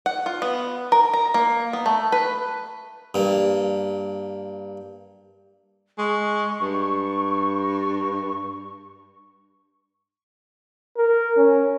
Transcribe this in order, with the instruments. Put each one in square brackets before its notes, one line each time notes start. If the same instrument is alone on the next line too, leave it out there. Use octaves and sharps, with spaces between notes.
[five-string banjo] F#5
F4
B3
A#4
A#5
A#3
B3
A3
B4
[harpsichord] G2 A#3
[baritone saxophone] G#3 [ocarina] C#6
[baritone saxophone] G2
[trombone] A#4
C#4